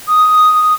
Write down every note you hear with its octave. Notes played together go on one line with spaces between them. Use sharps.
D#6